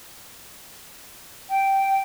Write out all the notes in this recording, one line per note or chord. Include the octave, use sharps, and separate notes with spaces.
G5